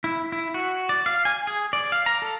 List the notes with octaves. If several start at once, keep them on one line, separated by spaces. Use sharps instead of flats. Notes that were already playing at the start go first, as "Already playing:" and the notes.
E4
E4
F#4
D5
F5
G#5
G#4
D5
F5
A#5
A4